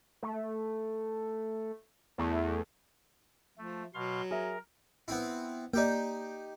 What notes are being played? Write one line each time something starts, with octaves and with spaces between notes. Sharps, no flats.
A3
E2 A3
F3 A3
B2 F#3 F5 C6
G#4 A#4 E5
B3 C4 E4
A#3 D#4 G4 D5 G5